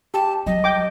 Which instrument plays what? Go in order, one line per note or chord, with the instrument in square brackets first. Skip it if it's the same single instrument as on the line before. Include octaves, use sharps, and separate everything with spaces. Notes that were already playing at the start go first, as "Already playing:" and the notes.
[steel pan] G4 [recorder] A5
[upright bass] F#3 [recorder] D#5
[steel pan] G5 D6